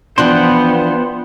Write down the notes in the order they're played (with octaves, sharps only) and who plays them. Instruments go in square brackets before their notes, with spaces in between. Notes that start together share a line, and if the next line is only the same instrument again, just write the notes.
[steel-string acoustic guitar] E3 F3 D4 [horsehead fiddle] B3 [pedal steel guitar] C5 F#5 G5